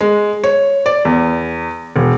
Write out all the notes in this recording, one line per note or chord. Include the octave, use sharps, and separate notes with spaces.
G#3
C#5
D5
E2
E1